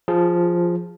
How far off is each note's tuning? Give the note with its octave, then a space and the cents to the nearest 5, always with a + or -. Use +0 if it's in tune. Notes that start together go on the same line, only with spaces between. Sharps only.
F3 +0 G#4 -5